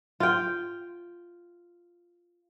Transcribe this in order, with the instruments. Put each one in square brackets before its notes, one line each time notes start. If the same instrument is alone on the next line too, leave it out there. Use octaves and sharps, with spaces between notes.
[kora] F4 G5